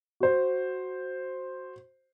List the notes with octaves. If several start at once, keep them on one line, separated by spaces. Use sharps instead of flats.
F#4 C5